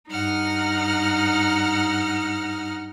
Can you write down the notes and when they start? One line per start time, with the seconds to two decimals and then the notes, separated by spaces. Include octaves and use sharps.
0.10 G2 D#4 F#5 F6